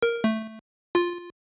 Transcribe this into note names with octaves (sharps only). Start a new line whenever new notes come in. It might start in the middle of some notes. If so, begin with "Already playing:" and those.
A#4
A3
F4